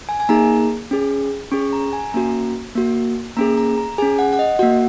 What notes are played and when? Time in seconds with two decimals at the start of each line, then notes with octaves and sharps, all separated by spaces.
0.09 G#5
0.20 G#5
0.29 A#3 D#4 G#4 A#5
0.91 C#4 G#4
1.51 C#4 G#4 C#6
1.73 A#5
1.93 G#5
2.13 A#3 C#4 F#4 A#5
2.75 A#3 F#4
3.36 A#3 C#4 G#4 A#5
3.58 A#5
3.78 A#5
3.98 C#4 G#4 G#5
4.19 F#5
4.33 F#5
4.39 D#5
4.59 F#4 F#5
4.63 A#3